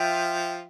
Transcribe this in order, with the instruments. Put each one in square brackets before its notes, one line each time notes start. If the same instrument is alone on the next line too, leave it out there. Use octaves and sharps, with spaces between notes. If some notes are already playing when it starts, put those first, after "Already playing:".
Already playing: [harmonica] F3 F4 [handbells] E5 G5